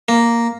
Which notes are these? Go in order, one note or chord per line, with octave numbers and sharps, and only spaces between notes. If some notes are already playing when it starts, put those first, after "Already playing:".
A#3